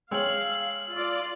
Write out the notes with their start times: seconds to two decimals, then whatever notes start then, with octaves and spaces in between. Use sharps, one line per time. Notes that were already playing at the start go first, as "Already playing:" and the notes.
0.11 G#3 C#5 F5 G5 E6 F#7
0.91 F4 D5